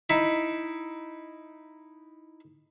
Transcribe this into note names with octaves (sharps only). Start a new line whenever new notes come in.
D#4 E4